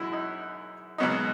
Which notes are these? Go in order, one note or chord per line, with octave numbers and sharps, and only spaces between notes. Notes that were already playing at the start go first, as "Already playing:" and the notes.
Already playing: F#2 E3 G#3 C#4 E4 F#4
D#4
C#2 B2 F#3 B3 D#4